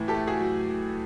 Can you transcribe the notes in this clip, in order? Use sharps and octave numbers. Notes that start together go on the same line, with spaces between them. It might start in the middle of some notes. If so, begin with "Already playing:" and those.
Already playing: A2 E3
G4 A4
A3
F#4 G#4
F#3